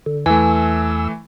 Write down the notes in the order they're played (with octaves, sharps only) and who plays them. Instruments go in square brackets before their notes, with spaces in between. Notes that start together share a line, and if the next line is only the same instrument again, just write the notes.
[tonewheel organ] D3
[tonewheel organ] E2 E6 [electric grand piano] E3 A3 [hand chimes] G#5